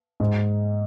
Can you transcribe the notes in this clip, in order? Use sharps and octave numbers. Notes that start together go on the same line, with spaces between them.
G#2